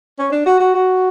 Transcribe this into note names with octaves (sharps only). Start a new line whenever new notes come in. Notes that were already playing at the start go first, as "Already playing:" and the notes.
C#4
D4
F#4
F#4
F#4